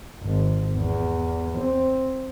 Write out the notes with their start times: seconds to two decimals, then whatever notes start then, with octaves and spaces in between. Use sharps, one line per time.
0.23 G#1
0.76 E2
1.58 C4